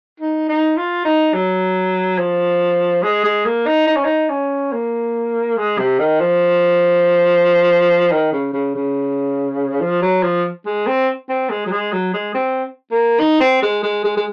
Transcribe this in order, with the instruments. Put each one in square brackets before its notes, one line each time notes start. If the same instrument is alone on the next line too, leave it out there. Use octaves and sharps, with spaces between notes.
[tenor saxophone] D#4
D#4
F4
D#4
F#3
F3
G#3
G#3
A#3
D#4
D#4
C#4
D#4
C#4
A#3
G#3
C3
D#3
F3
D#3
C#3
C#3
C#3
F3
F#3
F3
G#3
C4
C4
G#3
F#3
G#3
F#3
G#3
C4
A#3
D#4
C4
G#3
G#3
G#3
G#3